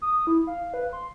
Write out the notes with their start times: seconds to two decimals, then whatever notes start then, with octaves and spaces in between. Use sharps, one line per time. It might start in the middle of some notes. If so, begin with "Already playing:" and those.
0.02 D#6
0.27 E4
0.47 F5
0.74 B4
0.93 C6